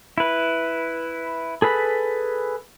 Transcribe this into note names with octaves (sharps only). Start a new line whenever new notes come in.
E4 B4
G#4 A4 B4 B5